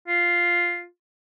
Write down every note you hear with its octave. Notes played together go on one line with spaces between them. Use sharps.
F4